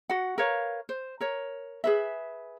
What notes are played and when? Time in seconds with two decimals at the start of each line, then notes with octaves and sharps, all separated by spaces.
0.10 F#4 F#5
0.38 A#4 B4 C#5 F5
0.89 C5
1.20 A#4 C#5
1.84 G#4 B4 E5